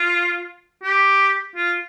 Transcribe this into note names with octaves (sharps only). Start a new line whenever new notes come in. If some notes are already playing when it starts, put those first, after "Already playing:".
Already playing: F4
G4
F4